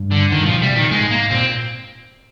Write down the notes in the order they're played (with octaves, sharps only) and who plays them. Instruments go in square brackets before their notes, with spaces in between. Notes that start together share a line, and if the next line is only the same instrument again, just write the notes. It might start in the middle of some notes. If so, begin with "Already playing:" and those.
Already playing: [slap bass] G2
[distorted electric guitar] D3
[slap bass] G2 [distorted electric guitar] D#3
[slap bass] A#2 [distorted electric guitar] F3
[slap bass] C3 [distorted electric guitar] G3
[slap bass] A#2 [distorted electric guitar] D#3
[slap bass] G#2 [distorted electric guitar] G#3
[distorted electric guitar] A#3
[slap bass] A#2 [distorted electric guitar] C4